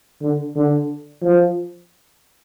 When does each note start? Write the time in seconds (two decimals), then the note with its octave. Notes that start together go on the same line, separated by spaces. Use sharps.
0.22 D3
0.56 D3
1.22 F3